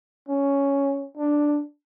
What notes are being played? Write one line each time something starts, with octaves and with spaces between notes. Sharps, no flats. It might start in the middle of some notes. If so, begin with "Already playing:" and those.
C#4
D4